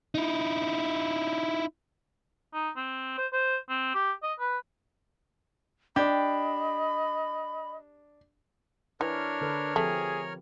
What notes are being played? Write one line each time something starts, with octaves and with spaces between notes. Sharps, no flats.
D#4 E4
D#4
C4
C5
C5
C4
G4
D#5
B4
D4 G4 D#5 B5
E3 D4 A#4 B4 C#5 F6
D3 A4 B4
F3 A3 C4 G4 G#4